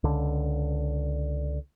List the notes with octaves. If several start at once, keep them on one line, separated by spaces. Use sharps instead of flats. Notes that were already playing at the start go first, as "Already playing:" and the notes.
C#2 D3